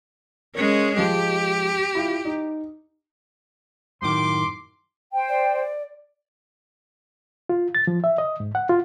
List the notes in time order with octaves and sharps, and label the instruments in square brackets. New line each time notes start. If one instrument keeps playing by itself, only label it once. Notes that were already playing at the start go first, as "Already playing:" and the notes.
[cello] G#3 C#4 [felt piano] A#4
[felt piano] F3 G#3 [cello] G4
[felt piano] E4 F4
D#4
[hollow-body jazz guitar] F#2 A2 D#3 [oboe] C6 [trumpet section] D6
[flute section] C5 G5
[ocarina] D5
[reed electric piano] F4
A6
F3
E5
D#5
G#2
F#5
F4